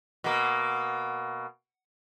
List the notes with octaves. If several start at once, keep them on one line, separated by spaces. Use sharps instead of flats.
B2 A#3